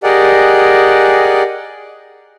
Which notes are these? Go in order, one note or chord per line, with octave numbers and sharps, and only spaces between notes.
G4 G#4 A#4 D5 D#5 F#5